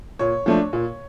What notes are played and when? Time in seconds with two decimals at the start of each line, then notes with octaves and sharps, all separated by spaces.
0.19 A#2 C#5
0.46 F3 A3 D4
0.73 A#2